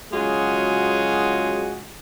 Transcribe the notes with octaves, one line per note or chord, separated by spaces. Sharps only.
C#3 F#3 G#3 F4 F#4 G#4